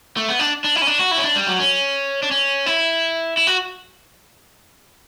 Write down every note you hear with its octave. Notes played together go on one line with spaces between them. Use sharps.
A3
B3
D4
D4
E4
C#4
D4
F#4
E4
C#4
D4
G3
F#3
C#4
D4
C#4
E4
E4
F#4